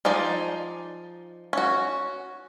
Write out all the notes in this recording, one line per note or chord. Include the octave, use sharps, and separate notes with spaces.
F3 D#4 G#4 D5
C#4 F#4